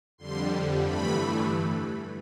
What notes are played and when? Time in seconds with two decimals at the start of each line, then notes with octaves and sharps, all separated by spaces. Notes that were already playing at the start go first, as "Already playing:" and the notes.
0.18 F2 D3 G3 C6
0.82 G2 E3 A3 B5